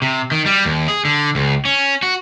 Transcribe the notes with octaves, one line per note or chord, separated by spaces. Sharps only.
C3
D#3
G3
D#2
G#4
D3
C#2
C#4
F#4